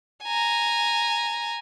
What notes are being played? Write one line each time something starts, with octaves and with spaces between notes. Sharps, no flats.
G#5 A#5